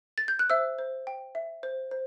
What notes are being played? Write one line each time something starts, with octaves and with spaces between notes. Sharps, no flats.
A6
G6
F#6
C5 E5 E6
C5
G5
E5
C5
C5